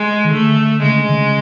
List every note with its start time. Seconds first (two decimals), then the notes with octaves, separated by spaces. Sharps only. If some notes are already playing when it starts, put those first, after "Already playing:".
Already playing: G#3
0.25 D#3
0.32 D3 A3
0.83 C#3 G#3
0.96 D3
1.10 C#3